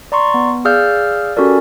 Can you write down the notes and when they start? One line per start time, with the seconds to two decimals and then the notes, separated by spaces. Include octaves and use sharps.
0.12 D5 A#5 C6 C#6
0.34 B3
0.65 G#4 D5 F5 E6 F6 G6
1.36 C#4 F#4 G4 A4 A#4 D5